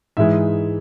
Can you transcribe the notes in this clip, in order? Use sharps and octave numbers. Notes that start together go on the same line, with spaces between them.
G#2 E3 G#3 E5